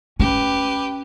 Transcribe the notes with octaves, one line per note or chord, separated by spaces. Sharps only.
C#4 G4 B4